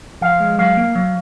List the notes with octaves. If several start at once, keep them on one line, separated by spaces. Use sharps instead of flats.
F3 F5
G#3
F#3 F5
A#3
F#3